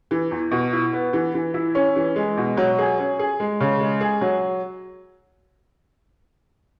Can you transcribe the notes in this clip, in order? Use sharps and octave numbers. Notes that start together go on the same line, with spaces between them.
E3
E2
B2
E4
B3
E3
E3
E4
C#4
E3
G#3
B2
F#3
G#4
C#4
G#4
G#3
C#3
G#3
G#4
F#3